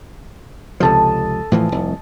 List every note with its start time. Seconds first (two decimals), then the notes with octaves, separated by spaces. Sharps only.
0.80 C#2 C3 F3 A4 D#5
1.52 A2 E3 F3 G#5
1.72 F1 C2